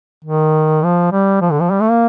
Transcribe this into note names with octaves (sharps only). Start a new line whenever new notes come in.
D#3
F3
G3
F3
D3
F3
G3
A3
A#3